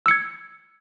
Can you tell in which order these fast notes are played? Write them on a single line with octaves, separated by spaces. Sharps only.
E6 C#7 G#6